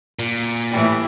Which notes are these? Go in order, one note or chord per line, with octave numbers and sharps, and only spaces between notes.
A#2
A2 E3 G3